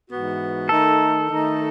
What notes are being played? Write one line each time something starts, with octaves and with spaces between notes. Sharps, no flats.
G#2 E3 B3 F#4
D#3 A3 D#4 A4
D#3 A3 D#4